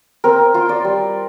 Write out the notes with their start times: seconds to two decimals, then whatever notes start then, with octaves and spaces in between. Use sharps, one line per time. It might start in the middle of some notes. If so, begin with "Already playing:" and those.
0.24 C4 A#4
0.54 F4
0.69 D5
0.84 G3